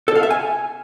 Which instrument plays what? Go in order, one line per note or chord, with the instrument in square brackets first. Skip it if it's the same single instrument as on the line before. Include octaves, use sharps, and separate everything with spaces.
[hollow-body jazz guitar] A4
F5
E5
G#5